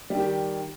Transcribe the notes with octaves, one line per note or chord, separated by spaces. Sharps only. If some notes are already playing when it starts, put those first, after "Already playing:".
D#3 G3 G4